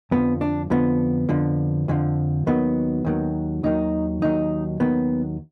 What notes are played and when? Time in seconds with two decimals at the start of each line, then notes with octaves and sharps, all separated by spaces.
0.11 F2 D3 F3 B3
0.41 D4
0.70 F2 D3 F3 B3
1.29 F2 D3 F3
1.88 F2 D3 F3
2.46 D#2 D#3 F#3 B3
3.05 D#2 D#3 F#3
3.63 D#2 D#3 F#3 D#4
4.22 D#2 D#3 F#3 D#4
4.80 D#2 D#3 F#3 B3